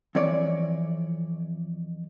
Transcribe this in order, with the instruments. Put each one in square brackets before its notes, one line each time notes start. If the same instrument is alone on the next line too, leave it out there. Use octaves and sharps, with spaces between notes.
[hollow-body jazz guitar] F2 E3 C#5 D5